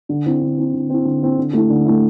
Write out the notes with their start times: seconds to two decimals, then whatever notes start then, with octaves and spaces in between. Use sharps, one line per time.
0.09 D3
0.26 C4 E4
0.41 D3
0.58 C4 E4
0.73 D3
0.90 C4 E4
1.05 D3
1.22 C4 E4
1.38 D3
1.53 A3 E4
1.70 D3
1.85 A3 E4